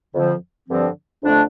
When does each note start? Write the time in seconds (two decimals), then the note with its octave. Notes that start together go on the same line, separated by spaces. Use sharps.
0.13 F2 D3 F3
0.69 G2 D3 F3 C4
1.24 F2 D3 A3 D4